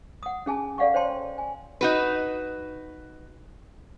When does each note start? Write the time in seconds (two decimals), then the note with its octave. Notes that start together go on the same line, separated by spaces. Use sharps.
0.23 F#5 D#6
0.46 C#4 G#4 G#5 A5
0.78 A4 D5 F5 F#5 C#6
0.94 C5 C#5 G5 A5 C6
1.38 G#5
1.81 D#4 F#4 B4